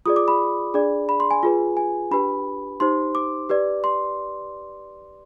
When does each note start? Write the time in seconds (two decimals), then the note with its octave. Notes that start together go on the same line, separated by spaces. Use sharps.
0.06 F4 G#4 D5 D#6
0.16 D6
0.28 B5
0.74 D4 G#4 D5
1.09 B5
1.20 C6
1.31 G#5
1.43 F4 G#4 B4
1.77 G#5
2.11 D4 G4 B4 B5
2.80 D#4 G4 C5 C6
3.15 D6
3.49 G4 B4 D5
3.84 C6